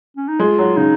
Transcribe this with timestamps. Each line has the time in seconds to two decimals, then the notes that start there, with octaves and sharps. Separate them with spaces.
0.17 C#4
0.28 D#4
0.39 G#3 F4
0.58 F#3
0.77 C#3 D#4